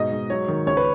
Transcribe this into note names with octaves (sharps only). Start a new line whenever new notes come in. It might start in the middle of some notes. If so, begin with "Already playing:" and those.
Already playing: G#2 B2 D#5
G#2
F#3 C#5
D#3
C#2 C#5
B4